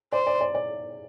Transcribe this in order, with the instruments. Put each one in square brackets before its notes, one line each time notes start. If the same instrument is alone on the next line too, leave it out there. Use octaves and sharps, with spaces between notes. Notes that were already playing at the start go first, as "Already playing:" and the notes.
[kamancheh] C5 [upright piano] D5
[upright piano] D5
D5
D5